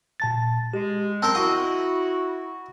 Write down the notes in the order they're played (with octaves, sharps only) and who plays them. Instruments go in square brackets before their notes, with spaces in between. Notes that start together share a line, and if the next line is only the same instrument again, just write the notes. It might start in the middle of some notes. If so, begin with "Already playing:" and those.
[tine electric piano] A#2 A5 A6
[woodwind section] G#3 [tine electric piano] G4
[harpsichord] C4 A#4 C5 [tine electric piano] A5
[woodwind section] E4 F#4 [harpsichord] D#5 [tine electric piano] F#5 C#6